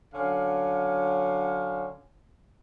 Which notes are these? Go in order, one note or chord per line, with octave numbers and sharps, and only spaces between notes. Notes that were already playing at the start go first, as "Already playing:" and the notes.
D3 F#3 C#4 F5